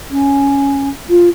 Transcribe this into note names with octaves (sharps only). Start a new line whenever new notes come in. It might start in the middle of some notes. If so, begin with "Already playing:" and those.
C#4
F4